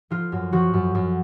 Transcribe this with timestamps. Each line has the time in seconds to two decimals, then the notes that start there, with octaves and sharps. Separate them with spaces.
0.10 F3 F4
0.32 F#2
0.53 F3 F#4
0.74 F#2
0.95 F#2